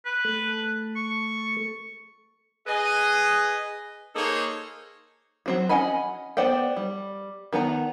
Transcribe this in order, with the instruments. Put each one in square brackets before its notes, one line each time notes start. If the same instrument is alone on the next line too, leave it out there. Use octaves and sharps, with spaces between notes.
[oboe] B4
[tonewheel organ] A3 A4
[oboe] C#6
[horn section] G#4 B4 D#5
A#3 D#4 G#4 A4 C5 C#5
[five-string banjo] F#3 C4 F#4
C#4 D#5 F#5 G#5 B5
B3 C5 D5 F#5 G5
G3
D#3 B3 F#5 A#5